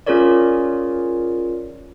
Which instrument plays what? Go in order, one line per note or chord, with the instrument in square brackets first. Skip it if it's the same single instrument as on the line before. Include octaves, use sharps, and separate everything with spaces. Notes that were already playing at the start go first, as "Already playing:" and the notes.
[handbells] C#4 F4 G#4 A#4 C#5 D5